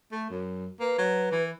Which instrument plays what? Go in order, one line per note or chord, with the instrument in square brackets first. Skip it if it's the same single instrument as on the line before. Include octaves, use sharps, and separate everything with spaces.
[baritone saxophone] A3
F#2
[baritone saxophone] A#3 [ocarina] B4
[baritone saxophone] F#3
E3